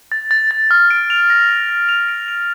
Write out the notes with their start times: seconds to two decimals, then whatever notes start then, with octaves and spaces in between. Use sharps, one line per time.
0.12 A6
0.31 A6
0.51 A6
0.71 F6
0.90 D7
1.10 F7
1.30 A#6
1.50 A#6
1.69 A#6
1.89 F7
2.08 D7
2.28 F7